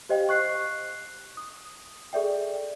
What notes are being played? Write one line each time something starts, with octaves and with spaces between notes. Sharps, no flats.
G4 C5 D#5 F5 G5
C#6 F#6 C7
D#6
G#4 A4 D5 E5 G5